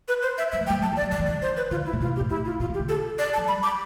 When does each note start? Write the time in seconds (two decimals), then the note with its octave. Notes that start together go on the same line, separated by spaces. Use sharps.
0.08 B4
0.22 C5
0.38 E5
0.52 G3 E5
0.61 F3
0.67 G5
0.70 G3
0.82 F3 A5
0.92 F3
0.97 D5
1.02 F3
1.11 D3 D5
1.20 E3
1.26 D3 D5
1.42 C5
1.57 B4
1.71 D3 F4
1.85 E4
1.93 B2
2.00 C3 F4
2.16 G4
2.21 A2
2.30 E4
2.45 F4
2.60 B2 F4
2.70 C3
2.74 G4
2.80 D3
2.89 A4
3.19 D5
3.33 A5
3.37 F3
3.48 G3 B5
3.63 D6